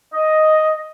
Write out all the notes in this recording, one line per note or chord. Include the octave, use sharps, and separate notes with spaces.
D#5